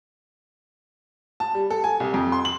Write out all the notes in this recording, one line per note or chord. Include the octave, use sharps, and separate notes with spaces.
A5
G3
A4
G#5
C2
F2
C6
F#7